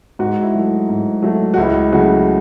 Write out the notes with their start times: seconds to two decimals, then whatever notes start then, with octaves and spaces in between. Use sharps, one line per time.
0.19 G#2 F#4
0.42 E4
0.55 F#3 A3
0.89 G#2
1.22 F#3 A3
1.54 F#4
1.57 C#2 E4
1.92 C#3 F#3 A3 F#4